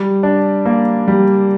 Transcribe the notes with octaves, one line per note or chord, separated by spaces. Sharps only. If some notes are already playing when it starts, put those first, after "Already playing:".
Already playing: G3
D4
A#3
G3